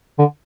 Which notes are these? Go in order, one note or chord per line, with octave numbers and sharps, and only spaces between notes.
D3